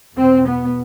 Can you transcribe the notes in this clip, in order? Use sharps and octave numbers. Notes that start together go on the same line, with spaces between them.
E2 B2 C4
B3